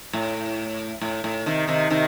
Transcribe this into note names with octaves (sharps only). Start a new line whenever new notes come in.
A2
A2
A2
C3 D#3
C3 D#3
C3 D#3